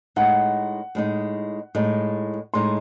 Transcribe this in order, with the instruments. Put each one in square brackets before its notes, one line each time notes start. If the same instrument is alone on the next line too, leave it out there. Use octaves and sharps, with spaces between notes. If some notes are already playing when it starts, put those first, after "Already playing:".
[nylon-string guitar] A2 G#3 D#4 [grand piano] F#5
[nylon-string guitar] A2 G#3 D#4
A2 G#3 D#4
[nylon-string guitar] A2 G#3 D#4 [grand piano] C6